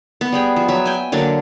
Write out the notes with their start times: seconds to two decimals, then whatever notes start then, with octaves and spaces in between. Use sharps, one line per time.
0.21 B3
0.32 G3 G#4 G5
0.56 F3
0.68 F#3 E5
0.85 G5 G#5
1.12 D3 F#3 A#3 D4